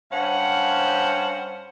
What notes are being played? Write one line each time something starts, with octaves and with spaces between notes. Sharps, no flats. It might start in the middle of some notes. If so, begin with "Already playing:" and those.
G2 C#4 C5 F5 F#5